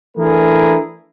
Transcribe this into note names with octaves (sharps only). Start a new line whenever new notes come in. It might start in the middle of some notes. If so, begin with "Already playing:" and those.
E3 A3 D4 E4 G#4 A#4